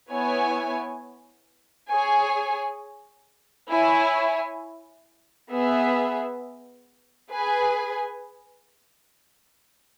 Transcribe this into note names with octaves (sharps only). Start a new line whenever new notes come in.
B3 E4 C#5 G#5
G#4 C#5 G#5
E4 C#5 G#5
B3 G#4 E5
G#4 B4 G#5